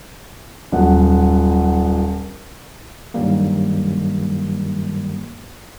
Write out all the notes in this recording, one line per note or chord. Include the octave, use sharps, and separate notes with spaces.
D#1 F#2 F#5
G2 D#3 F#3 G3 A#3